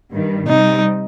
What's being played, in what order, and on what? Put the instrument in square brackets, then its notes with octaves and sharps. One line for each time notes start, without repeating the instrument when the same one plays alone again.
[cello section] G2 D#3 G3
[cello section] C3 G3 C4 [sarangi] D#4